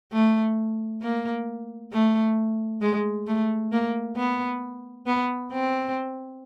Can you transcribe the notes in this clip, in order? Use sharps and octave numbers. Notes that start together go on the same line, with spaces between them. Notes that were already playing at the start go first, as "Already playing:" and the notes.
A3
A#3
A3
G#3
A3
A#3
B3
B3
C4